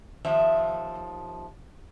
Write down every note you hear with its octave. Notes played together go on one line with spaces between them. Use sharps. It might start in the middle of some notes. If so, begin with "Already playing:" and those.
D#2 F3 E5